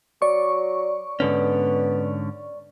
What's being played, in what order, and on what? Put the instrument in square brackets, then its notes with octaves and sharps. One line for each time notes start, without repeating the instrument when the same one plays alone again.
[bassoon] F#3 [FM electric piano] D5 C#6
[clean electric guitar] G#2 D3 C#4 [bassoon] B3